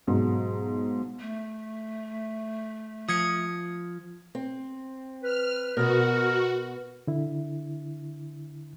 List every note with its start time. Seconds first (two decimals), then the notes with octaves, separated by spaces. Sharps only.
0.07 B1 G#2 F#3
1.20 A3
3.09 F3 D#6 G#6 C#7
4.35 C4
5.23 B4 F6
5.77 B2 B3 F#4 A#4
7.07 D3 E4